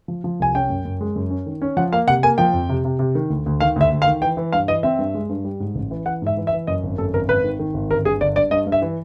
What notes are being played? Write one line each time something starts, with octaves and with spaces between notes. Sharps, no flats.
F3
F3
C2 G#5
C#4 G5
F#2
F#2
G#3
F#2
C#4
D#3
C#4
F3 F#5
A#3 F5
C3 F#5
A#3 G#5
F3 G5
F2
C3
C3
C3
D#3
D2
D2
D#3 F5
D2 E5
D2
F5
D#3
E3 G5
E3
G2 F5
E3 D#5
C4 E5
G2
G#3
G2
G3
G#2
A1
E3
E3 F#5
G#2 E5
E3
E5
E3
F#2 D#5
G#1
F#2 A4
G#1 A#4
G#1 B4
D#3
D#3
G#1
G1 A#4
G2 G#4
G1 D5
G2 D5
G2 D#5
G2
E5
E3